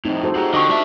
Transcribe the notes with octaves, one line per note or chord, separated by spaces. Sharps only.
F2 A2 C4 D#4 E4
F#4 A4 C5
F4 G4 G#4 F#5 A#5
D3 F#4 D#5 G5 C#6 D6
G#2 D4 E5 D6